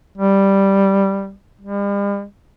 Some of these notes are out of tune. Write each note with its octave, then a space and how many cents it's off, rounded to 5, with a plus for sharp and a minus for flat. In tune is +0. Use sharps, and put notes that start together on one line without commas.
G3 +0
G3 +45